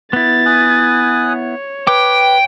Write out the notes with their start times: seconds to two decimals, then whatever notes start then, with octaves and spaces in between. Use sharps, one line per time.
0.13 B3 E4 A6
0.46 G#5 D#6 F#6
1.26 C#5
1.87 B4 G5 D6